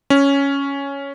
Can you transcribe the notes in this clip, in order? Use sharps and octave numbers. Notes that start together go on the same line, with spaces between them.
C#4